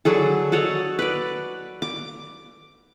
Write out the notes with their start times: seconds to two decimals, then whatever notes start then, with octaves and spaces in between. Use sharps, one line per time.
0.05 D3 F#3 G#4 A4
0.52 F#4 A4 C#5 D#5
0.99 B4 D5
1.82 D6